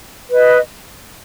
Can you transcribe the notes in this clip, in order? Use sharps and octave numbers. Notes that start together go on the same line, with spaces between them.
B4 D#5